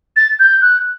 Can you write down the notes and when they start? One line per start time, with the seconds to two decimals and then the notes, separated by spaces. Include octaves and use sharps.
0.16 A6
0.39 G6
0.62 F#6